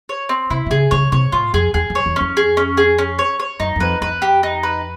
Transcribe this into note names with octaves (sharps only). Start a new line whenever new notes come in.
C#5
C4
C3 E4
C3
C#3 G#4
C#3 C#5
C3 C#5
A2 F4
F2 G#4
E2 G#4
F2
C#5
E2
F2 C#4
G#4
C#4
G#4
C#4
C#5
C#5
F#2 D#4
F#2
F2 B4
F2 B4
G4
D#4
B4